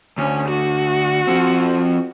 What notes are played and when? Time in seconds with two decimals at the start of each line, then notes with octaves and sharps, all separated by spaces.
0.18 D2 C#4
0.49 F#4
1.27 F3 C4